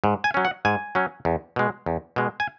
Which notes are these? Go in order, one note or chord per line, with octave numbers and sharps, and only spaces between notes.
G#2
G#5
F#3 C#4
F#5
G#2 G#5
F#3 C#4
E2
B2 G#3
E2
B2 G#3
G#5